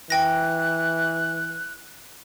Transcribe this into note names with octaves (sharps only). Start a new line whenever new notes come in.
E3 G5 F#6 A#6